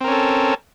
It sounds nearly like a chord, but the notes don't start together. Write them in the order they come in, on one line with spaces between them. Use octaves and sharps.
C4 A#4 C#4 A4